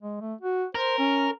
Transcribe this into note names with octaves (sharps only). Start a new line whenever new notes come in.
G#3
A3
F#4
A#4 C5
C#4